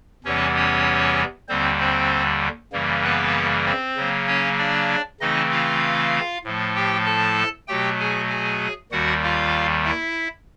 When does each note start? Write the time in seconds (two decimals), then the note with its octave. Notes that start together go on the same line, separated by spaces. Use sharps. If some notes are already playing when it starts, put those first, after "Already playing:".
0.24 E2 C3 E3 G3 B3 C#4 C#5
0.55 C#4 C#5
1.48 D#2 D3 G3 C4 C5
1.79 C4 C5
2.72 F#2 C#3 E3 G3 A#3
3.03 B3 B4
3.66 C4 C5
3.96 C#3 F#3 A#3
4.27 C#4 C#5
4.58 D4 D5
5.20 C#3 E3 A3 C4 D#4 D#5
5.51 F4 F5
6.44 A2 F3 A3
6.75 G4 G5
7.06 A4 A5
7.68 B2 F#3 A3 G4 G5
8.00 G#4 G#5
8.30 G#4 G#5
8.92 D#2 D#3 G3 F#4 F#5
9.23 F4 F5
9.84 E4 E5